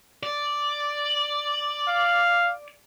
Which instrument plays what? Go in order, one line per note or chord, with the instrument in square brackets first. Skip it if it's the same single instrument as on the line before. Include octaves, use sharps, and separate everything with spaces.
[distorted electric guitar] D5
[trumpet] F5